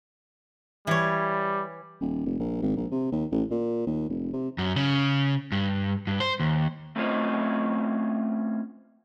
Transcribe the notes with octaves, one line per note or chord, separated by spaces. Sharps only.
E3 G3 C#5
D#1
F1
A#1
G#1
A#1
C3
D#2
A1
A#2
D#2
F1
C3
F#2
C#3
G2
G2
C5
D#2
A3 C4 C#4 F4 C5 D#5